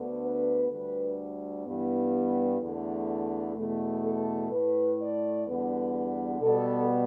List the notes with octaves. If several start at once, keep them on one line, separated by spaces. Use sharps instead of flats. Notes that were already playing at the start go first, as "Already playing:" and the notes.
Already playing: D2 D3 B3
B4
D2 D3 G3 B4
G2 E3 G3 B3
E2 D3 A3
E2 B2 A3
A4
A2 A3 B4
D5
E2 D3 G3 B3 B4
B2 G3 B3 A4